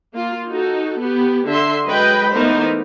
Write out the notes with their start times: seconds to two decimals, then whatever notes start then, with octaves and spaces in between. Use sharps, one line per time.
0.14 A#3 F4
0.49 D#4 F#4 A4
1.00 B3 G4
1.48 D3 E5 C6
1.86 F#3 G#3 B4 D#5 G5 B5
2.32 E3 A3 B3 D#4 A#4 C5